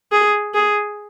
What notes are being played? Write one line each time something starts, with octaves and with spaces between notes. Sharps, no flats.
G#4
G#4